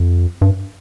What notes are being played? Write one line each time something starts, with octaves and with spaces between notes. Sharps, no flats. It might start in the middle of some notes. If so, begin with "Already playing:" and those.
Already playing: F2
G2